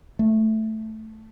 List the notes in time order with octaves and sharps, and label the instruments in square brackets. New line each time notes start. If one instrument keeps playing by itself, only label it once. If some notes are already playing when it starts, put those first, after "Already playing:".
[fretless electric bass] A3